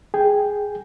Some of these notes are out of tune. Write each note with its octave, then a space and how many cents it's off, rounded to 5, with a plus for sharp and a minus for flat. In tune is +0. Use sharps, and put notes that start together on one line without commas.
G#4 +0 G5 +0